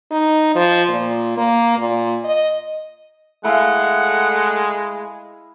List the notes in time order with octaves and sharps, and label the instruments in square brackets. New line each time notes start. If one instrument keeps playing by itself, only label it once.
[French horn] D#4
F3
A#2
A#3
A#2
D#5
[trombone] G#3 [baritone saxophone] A3 [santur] E4 F5 [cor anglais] F#5